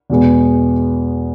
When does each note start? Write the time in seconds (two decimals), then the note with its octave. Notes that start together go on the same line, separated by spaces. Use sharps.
0.10 E2 B2 G#3 B3